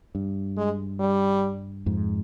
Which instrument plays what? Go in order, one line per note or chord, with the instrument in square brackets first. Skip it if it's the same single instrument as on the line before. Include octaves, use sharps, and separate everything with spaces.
[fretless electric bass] G2
[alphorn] G#3
G3
[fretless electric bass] F2 G#2